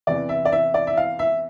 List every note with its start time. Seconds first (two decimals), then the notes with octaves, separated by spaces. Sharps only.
0.07 E2 C3 E3 D5
0.29 E5
0.45 D5
0.52 E5
0.74 D5
0.87 E5
0.97 F5
1.19 E5